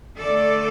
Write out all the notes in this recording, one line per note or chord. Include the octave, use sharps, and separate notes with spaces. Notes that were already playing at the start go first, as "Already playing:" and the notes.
D3 A3 A4 D5